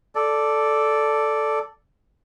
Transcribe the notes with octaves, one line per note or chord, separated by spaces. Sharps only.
A4 D5